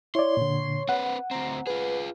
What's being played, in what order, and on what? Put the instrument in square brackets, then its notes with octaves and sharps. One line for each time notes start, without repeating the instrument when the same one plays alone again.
[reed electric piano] E4 D5 [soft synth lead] C#5 [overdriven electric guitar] C6
[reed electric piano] A#2 D3
[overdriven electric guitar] C4 B4 [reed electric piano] F#5
[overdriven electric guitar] D2 C4 [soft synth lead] A#5
[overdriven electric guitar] F4 G#4 [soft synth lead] B4